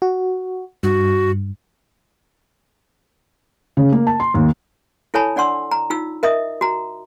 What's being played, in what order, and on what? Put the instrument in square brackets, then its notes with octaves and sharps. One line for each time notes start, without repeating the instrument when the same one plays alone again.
[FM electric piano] F#4
[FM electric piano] G2 [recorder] F#4
[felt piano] C#3
A#3
A5
C6
D#2
[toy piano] E4 A4 C#5 G#5 A5 B5
D4 D5 F#5 C6 E6
A#5
D#4 F4 E6
A#4 D#5 E5 D#6
F#4 A#5